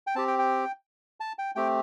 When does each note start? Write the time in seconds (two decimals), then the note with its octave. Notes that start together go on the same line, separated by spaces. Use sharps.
0.07 G5
0.16 C4 G4 A5
0.28 G5
0.39 G5
1.20 A5
1.39 G5
1.56 A3 C4 G4 G5